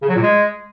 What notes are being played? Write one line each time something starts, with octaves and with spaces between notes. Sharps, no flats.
C#3
F#3
A#2
G#3